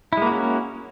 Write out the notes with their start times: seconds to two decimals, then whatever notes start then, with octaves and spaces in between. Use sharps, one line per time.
0.13 E4
0.17 G#3
0.22 A#3
0.27 F#4
0.31 C#4